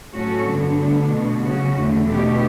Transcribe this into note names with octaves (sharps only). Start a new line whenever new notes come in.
A2 F#3 C#4 F#4 A4
G2 D3 F#3 B3 D4
D2 D3 G3 B3 D4
B2 G3 B3
C#3 F#3 C#4 F#4
E2 D3 A3
B2 A3 D4 G4